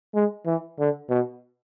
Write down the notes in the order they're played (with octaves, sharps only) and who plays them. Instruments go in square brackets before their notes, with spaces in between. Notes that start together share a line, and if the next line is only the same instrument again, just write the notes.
[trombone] G#3
E3
D3
B2